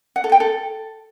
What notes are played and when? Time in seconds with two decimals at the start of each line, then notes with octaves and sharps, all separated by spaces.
0.16 F#5
0.24 A4
0.32 G5
0.40 A4